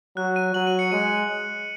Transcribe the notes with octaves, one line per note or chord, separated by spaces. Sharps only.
F#3 F#6
D#7
F#3 F#7
D#7
C#7
G#3 D#7